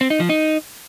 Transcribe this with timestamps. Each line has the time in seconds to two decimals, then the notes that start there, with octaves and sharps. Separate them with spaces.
0.01 C4
0.10 D#4
0.20 F3
0.29 D#4